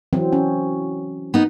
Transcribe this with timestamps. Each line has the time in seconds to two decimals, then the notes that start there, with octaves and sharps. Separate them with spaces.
0.13 E3 F#3 C4
0.33 C#4
1.34 B3 D#4